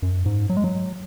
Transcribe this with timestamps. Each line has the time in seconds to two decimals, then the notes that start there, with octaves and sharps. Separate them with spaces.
0.02 F#2
0.26 G#2
0.49 F#3
0.57 G#3
0.64 F#3